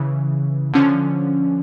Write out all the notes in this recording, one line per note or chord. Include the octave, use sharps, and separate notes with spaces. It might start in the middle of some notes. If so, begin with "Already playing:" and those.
Already playing: C#3 E3
D3 F3 C#4